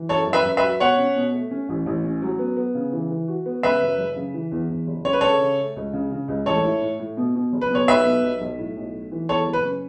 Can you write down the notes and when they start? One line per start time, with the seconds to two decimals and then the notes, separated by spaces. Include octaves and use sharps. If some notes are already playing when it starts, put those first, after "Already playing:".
Already playing: E3
0.09 F#2 A4 C#5
0.27 F#2
0.33 B4 E5
0.45 F#2
0.57 B4 E5
0.63 F#4
0.80 B2 C#5 F#5
0.98 C#4
1.16 B2
1.33 A3
1.51 C#4
1.69 A1
1.86 A1
2.04 C#4
2.22 F#3
2.39 B3
2.57 B3
2.75 C#3
2.93 E3
3.10 E3
3.28 F#4
3.46 B3
3.63 C#3 B4 E5
3.82 F#2
3.98 F#1
4.16 C#3
4.34 E3
4.52 E2
4.69 E2
4.87 F#1
5.05 C#3 C#5
5.13 B4
5.21 C#3 A4 C#5
5.41 C#3
5.58 A3
5.76 C#2
5.93 C#3
6.12 C#3
6.28 C#2
6.46 A1 A4 C#5
6.64 E4
6.82 A2
7.00 A2
7.17 B2
7.35 B2
7.53 F#1
7.61 B4
7.70 B2 C#5
7.88 B1 B4 E5
8.05 B2
8.23 B1
8.41 B1
8.59 A2
8.76 B1
8.94 A3
9.12 E3
9.29 E2 A4 C#5
9.47 F#1
9.53 B4
9.65 C#4